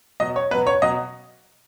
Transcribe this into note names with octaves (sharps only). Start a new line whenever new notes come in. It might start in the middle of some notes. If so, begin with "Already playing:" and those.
B2 F#3 D#5
C#5
B2 F#3 B4
C#5
B2 F#3 D#5